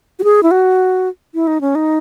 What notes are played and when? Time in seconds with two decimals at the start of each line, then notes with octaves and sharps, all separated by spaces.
0.19 F#4
0.24 G#4
0.43 E4
0.51 F#4
1.34 E4
1.47 D#4
1.61 C#4
1.75 D#4